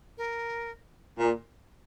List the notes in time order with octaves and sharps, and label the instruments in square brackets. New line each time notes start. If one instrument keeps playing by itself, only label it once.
[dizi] A#4
[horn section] A#2